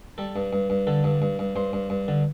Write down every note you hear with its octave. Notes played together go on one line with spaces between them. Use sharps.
G3 A4
G2
G2
G2
D3 A4
G2
G2
G2
G2 C5
G2
G2
D3